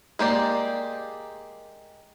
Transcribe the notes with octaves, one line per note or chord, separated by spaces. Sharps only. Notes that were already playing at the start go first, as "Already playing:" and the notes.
G#3 A#3 G4 D5